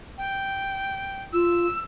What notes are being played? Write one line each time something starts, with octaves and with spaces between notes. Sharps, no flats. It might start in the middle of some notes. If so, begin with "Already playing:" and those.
G5
F4 E6